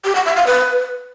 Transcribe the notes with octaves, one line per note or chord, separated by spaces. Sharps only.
G4
F#5
E5
F5
B4